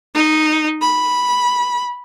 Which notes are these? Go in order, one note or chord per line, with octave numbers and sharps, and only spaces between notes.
D#4
B5